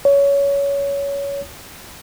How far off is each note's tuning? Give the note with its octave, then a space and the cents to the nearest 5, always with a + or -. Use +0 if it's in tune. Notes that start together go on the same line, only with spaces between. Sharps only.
C#5 +20